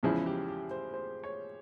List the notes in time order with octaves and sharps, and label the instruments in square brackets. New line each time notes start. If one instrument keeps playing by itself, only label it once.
[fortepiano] E2 C#3 F3 G#3 E4 [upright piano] G#4
[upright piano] G4
G4
C5
C5
C#5